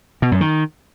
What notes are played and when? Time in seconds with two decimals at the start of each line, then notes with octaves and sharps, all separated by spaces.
0.22 B2
0.31 F#2
0.41 D#3